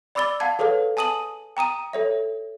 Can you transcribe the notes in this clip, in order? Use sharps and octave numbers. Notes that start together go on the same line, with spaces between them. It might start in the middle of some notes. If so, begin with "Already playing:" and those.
D5 B5 D6 E6 A6 G7
F5 F#5 A5 G#6
G#4 A4 B4 C#5 F5
G#5 A5 D#6 D#7 F#7
G5 A#5 D#6 D#7
A4 C#5 E5